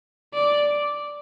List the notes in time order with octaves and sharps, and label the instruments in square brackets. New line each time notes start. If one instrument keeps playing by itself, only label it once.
[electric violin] D5